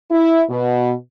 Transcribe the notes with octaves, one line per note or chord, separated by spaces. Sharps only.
E4
B2